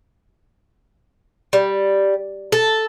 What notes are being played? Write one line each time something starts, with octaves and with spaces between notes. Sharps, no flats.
G3
A4